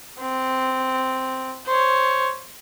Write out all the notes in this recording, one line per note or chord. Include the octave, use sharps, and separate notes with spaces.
C4
C5 C#5